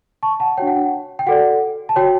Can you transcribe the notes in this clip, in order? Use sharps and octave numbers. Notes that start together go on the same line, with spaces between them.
A5 C#6
F#5 A5
D4 F#4 C#5 G5
F#5
G5
G5
F#4 A4 D5 F#5
A5
F#4 C#5 G5